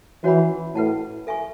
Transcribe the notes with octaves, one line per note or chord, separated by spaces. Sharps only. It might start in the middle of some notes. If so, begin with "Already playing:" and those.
E3 C#4 F#4 C#5 F#5 B5
A2 B4 F#5 A5
A4 E5 G#5 C#6